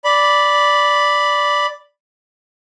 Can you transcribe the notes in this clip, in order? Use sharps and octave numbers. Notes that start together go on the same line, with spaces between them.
D5 B5